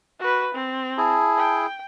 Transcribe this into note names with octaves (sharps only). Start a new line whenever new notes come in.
F#4 B4
C4
E4 G#4 A5
G5